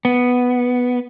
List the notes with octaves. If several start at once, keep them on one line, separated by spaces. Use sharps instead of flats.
B3